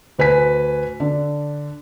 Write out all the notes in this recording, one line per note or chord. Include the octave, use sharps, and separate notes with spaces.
D2 B4 G#5 B6
D3 D4